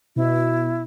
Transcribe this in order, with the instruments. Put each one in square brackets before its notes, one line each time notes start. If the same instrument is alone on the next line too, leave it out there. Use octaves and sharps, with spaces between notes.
[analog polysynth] B2 [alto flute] E4